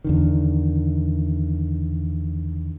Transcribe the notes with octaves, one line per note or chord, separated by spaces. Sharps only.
E2 D3 D#3